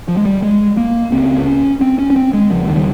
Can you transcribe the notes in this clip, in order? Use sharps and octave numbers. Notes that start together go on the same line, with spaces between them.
F3
G#3
G3
G#3
A#3
C#2 C#3 C4
C#4
C4
C#4
C#4
C4
G#3
D#2 C#3 F3
D#3
G3